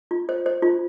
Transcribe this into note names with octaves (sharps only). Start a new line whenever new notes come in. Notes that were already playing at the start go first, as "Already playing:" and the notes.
F4
C5
C5
F4